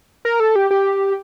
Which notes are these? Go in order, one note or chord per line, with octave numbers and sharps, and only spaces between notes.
A#4
A4
G4
G4